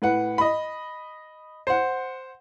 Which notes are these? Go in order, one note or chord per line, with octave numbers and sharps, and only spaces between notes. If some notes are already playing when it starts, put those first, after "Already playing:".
A2 B4 F#5
D#5 B5
C5 F#5